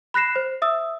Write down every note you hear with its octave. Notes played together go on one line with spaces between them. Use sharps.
B5 F#6 A#6 C7 E7
C5
E5 D#6 E6